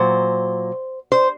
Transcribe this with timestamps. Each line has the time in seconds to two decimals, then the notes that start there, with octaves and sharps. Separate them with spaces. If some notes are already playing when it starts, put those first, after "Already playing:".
Already playing: A#2 F#3 C5
1.12 C5